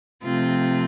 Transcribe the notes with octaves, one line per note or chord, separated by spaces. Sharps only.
C3 F3 A3 C4 F4